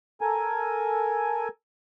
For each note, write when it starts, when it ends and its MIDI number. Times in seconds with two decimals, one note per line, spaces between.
0.21 1.48 69
0.21 1.48 70
0.21 1.48 80